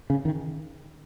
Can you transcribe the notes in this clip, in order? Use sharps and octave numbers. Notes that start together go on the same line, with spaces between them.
C#3
D#3